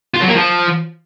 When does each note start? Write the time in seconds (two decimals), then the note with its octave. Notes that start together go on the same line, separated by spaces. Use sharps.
0.14 F4
0.21 F#3
0.28 A#3
0.35 F3